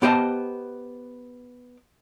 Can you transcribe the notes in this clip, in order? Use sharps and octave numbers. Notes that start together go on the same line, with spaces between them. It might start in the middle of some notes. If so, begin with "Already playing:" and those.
B3 G4 C5 D#5 A5